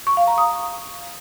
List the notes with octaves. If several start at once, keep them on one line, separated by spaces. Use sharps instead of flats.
C#6
F5
A#5
D#6